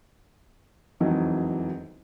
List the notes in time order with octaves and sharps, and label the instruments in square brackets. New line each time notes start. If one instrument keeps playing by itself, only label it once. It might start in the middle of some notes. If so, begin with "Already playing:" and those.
[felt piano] E1 F2 D#3 E3 F#3